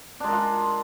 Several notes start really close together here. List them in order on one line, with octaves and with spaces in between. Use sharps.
D4 G#3 A#4 F4